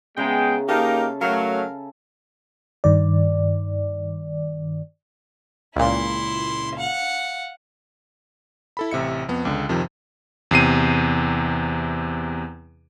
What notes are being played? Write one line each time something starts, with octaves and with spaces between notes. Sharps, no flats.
C#3 G#3 B3 E5 G5 A#5
A#3 D#4 G4 A4 A#4 F5
F#3 A3 A#4 F5
G2 D#3 D5
C#2 A#2 E4 C6
F5 F#5
E4 A4 B5
A1 C3 E5 C#7
F2 B3
C#2 D3
F2 C3 D#3 F3
E2 C3 C7 D#7